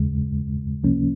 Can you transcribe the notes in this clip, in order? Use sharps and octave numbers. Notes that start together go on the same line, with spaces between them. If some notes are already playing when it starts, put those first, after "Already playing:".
Already playing: D#2 C#3 G#3
C#2 C3 F3 A#3 C#4